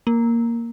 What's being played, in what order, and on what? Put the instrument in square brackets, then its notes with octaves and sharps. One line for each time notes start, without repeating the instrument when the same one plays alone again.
[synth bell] A#3